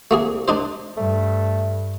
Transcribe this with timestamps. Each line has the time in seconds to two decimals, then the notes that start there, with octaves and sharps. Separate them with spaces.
0.11 C2 A3 A#3 G#4
0.48 D4 D#4 C5
0.97 G2 A3